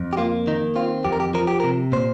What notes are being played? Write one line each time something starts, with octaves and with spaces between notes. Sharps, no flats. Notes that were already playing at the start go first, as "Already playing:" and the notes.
Already playing: F2
G4
A#3 F4
D#3 D#4
C4 F4
F2 G4
A#4
G4
F3 A#4
G4
C3 A#4
A#2 C5